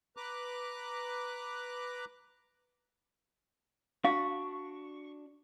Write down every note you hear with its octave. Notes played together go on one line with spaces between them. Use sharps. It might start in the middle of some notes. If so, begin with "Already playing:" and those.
B4 A#5 D6 F#6
D4 F#4 F5 C#6